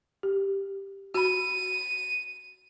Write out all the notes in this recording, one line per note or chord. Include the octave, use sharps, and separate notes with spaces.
G4
F#4 B5 D#7